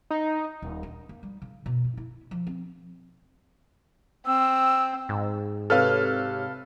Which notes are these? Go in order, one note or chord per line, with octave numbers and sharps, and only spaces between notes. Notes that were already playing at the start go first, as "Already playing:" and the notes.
D#4
D#1
D4
A#3
G3
C#3
B2
G2
E4
F3
C4
C4 E6
G#2
C3 A4 B4 C#5 F5 F6